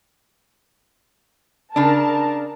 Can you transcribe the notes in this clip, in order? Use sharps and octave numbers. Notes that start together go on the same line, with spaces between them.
C#3 D4 A#4 A5